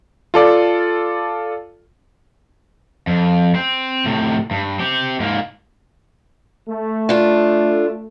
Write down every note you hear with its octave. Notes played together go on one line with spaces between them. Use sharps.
F4 A4 D5
F2
C4
A2 C3
G2
C4 G4
G#2 A#3
A3
D4 F4